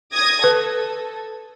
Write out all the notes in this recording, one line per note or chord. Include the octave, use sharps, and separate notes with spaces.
D#6 G#6 A#6
A4 B4